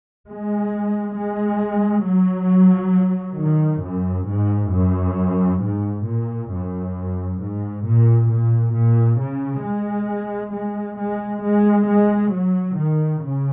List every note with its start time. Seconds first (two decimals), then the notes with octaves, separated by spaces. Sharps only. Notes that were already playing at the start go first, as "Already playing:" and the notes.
0.26 G#3
1.14 G#3
2.04 F#3
3.38 D#3
3.83 F#2
4.28 G#2
4.73 F#2
5.62 G#2
6.06 A#2
6.52 F#2
7.41 G#2
7.85 A#2
8.31 A#2
8.75 A#2
9.20 C#3
9.65 G#3
10.54 G#3
10.99 G#3
11.43 G#3
11.89 G#3
12.33 F#3
12.78 D#3
13.22 C#3